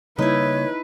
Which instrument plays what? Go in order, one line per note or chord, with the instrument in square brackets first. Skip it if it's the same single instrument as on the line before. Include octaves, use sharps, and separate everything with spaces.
[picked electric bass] C#3 G3 A#3 [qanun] D#4 E4 [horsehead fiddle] B4 [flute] C#5